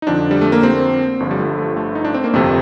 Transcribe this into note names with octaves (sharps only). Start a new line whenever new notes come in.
D#4
F2 D3 F3 D4
G3
A3
A#3
C4
G1 G2 D3 F3
G3
A3
A3
A3
D#4
D4
C4
A#3
G1 F2 C3 A3